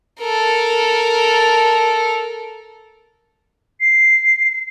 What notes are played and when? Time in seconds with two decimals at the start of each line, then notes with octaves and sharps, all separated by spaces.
0.20 A4 A#4
3.80 C7